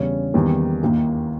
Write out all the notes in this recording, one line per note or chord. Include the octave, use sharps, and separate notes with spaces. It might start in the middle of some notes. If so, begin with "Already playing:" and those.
Already playing: E2 C#3 G3 C#4
E2 D#3 G3 A#3
D#2 D#3 A#3 E4